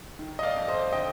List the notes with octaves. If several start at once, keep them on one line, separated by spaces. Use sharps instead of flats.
D#3
D#5
D5 F5
F2
C5 D#5
D3 D#5 G5